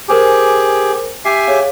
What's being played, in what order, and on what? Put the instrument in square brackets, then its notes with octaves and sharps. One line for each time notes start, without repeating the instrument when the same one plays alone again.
[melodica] G4 G#4 [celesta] A#4 C5 G#5
[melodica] G4 E5 G#5 [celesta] C7
[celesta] G#4 C#5 F5